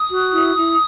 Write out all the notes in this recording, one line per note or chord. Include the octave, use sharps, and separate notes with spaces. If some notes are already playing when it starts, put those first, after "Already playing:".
Already playing: D#6
F#4
E4
E4